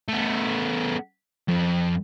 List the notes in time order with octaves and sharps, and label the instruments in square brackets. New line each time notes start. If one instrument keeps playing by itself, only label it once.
[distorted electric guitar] A3 B3
F2